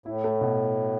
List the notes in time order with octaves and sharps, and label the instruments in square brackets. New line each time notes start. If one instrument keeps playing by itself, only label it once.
[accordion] A2 [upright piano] E4
[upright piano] A3
B2